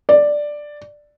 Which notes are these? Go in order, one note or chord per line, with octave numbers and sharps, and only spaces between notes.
D5